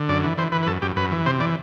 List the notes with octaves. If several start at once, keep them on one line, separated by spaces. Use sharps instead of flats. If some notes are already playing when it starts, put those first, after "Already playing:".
Already playing: D3
F#2 D5
E3
E3 C5
E3 B4
B4
F#2 A4
F#2 G4
F#2 B4
E3
C3 C5
E3 D5